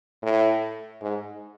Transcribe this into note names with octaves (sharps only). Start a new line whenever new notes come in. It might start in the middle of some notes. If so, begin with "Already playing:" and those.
A2
G#2